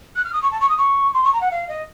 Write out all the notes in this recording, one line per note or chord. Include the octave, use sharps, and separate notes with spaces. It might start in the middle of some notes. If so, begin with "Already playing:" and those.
F#6
F6
D#6
C#6
A5
C#6
D#6
C#6
C6
C#6
A#5
F#5
F5
D#5